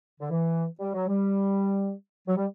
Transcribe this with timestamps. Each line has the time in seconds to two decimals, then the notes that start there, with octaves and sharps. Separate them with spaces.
0.20 D3
0.31 E3
0.80 G3
0.94 F#3
1.07 G3
2.28 F#3
2.37 G3